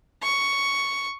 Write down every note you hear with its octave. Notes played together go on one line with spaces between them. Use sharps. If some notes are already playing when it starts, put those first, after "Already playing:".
C#6